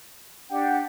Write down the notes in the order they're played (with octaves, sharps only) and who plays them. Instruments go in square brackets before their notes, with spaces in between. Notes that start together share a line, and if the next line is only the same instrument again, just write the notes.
[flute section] D4 G4 F#5 [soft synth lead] G5